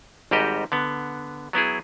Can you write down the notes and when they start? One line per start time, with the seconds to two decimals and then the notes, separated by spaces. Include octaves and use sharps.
0.31 G#1 G#2 G3 F#4 G4 D#5
0.72 D3 B3
1.53 F#3 B3 E4 G#4